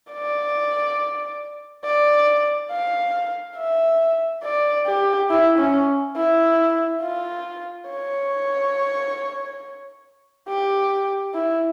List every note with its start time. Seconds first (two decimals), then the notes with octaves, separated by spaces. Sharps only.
0.12 D5
1.85 D5
2.71 F5
3.57 E5
4.44 D5
4.86 G4
5.30 E4
5.58 C#4
6.16 E4
7.02 F4
7.89 C#5
10.48 G4
11.34 E4